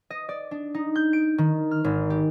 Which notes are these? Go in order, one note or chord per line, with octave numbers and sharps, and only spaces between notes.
D#5
D5
D4
D#4
G6
D7
D#3
F6
G#1
G4